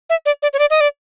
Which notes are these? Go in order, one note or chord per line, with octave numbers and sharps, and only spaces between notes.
E5
D5
D5
C#5
D5
D#5
D5